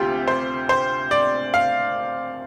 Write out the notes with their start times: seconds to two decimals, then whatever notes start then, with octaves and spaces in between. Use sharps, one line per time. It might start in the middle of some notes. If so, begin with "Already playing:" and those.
Already playing: D2 C3 F4 G4 C5
0.28 C5
0.69 C5
1.11 D5
1.54 F5